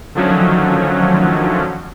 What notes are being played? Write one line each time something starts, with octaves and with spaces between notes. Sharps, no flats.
D3 D#3 F3 F#3 A3 C#4